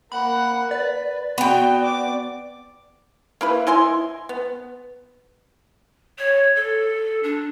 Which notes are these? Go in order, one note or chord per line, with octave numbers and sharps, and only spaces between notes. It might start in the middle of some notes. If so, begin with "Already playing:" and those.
A#3 F#5 B5
B4 D5
B3 F#4 G5
D6
A#3 E4 B4
E4 D#5 G#5 C6
B3
C#5
A4
D4